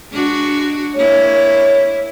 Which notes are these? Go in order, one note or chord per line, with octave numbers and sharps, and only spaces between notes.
G#3 D4 F#4
G#3 A#3 E4 C#5